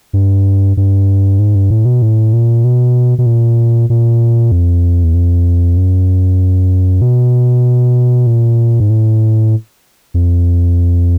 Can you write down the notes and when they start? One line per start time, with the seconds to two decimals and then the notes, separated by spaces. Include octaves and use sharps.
0.13 G2
0.77 G2
1.39 G#2
1.55 G2
1.70 A2
1.85 B2
2.02 A2
2.33 A#2
2.64 B2
3.18 B2
3.26 A#2
3.90 A#2
4.52 F2
5.04 E2
5.14 F2
5.77 F#2
7.02 B2
8.27 A#2
8.80 G#2
8.90 A2
10.14 F2